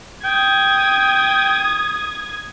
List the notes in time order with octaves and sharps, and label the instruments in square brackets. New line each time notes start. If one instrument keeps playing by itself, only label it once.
[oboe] G5 [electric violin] D#6 G#6